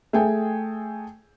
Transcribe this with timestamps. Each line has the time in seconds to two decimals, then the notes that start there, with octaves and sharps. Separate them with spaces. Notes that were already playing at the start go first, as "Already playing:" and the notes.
0.13 A3 G#4 G5 G#5